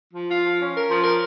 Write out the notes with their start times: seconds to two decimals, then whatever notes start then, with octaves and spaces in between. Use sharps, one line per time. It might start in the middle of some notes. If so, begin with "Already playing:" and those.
0.13 F3
0.29 F4
0.43 F3
0.59 C#4
0.75 A#4
0.89 F3
1.04 A#4